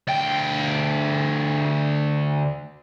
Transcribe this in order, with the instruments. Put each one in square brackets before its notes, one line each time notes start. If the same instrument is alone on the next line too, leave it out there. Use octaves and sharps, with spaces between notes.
[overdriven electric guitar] D2 G5